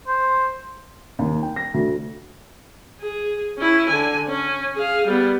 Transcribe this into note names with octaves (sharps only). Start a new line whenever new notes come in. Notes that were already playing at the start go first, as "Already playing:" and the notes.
C5
D#2
G5
A#6
D2
G#4
C#4 E4
D3 G#5
C#4
G#4 F5
G3 B3